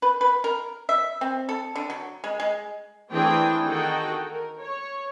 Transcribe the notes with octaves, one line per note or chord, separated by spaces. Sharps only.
B4
B4
A#4
E5
C4
A4
D3
F#3
G#3
G#3
E3 A3 C4 D4 G#4 G5
D#3 D#4 F#4 G#4 A4 G5
A#4
C#5